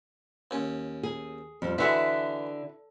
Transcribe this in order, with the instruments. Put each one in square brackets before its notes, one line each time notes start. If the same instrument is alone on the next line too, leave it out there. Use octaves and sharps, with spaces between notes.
[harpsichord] D#2 C#4
[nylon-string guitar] G#4
F2 G3
[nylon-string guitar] D3 [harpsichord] E3 G#3 [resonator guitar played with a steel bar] E4 F#4 E5